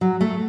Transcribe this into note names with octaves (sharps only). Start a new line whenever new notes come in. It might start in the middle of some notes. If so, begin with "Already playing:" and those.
F#3
A3